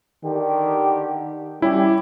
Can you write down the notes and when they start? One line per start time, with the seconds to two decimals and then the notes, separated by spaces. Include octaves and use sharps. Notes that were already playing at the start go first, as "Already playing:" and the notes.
0.24 D3 D#3 G4
1.62 G3 C#4 E4 G4